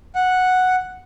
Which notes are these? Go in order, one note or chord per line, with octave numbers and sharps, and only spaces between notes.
F#5